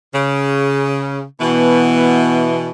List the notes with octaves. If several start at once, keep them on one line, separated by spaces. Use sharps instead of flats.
C#3
B2 E3 B3